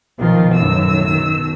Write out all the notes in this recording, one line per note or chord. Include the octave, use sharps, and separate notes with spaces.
B1 D#3 F3 F4
B1 F#2 A2 D#3 E6
B2